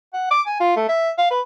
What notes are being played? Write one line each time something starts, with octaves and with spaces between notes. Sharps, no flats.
F#5
D6
G#5
F4
A3
E5
F5
B4